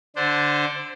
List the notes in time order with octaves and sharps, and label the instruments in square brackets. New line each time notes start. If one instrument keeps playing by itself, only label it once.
[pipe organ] D3 D4 C5